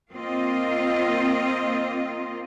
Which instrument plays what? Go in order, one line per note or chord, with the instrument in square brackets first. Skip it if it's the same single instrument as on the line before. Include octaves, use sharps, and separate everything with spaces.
[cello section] A#3 C4 F4 D#5